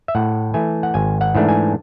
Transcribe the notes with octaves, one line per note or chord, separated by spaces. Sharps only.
E5
A2 F#5
E3 A3 G#5
F#5
G#1 G#5
F#5
G#2 E3 A3 D4
G#5